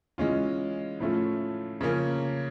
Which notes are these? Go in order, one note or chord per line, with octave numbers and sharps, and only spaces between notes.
E3 G#3 C#4 F4
A2 F3 A3 C#4 F4
C#3 F3 A#3 C#4